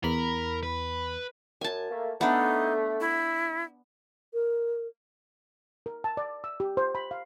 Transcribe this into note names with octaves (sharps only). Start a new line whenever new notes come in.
E2 A#4 B5
B4
F#2 G#5 A5
A3 A#3
A3 B3 D4 D#4
E4
A#4
A#4
A5
D5
E6
G4
C5
B5
F5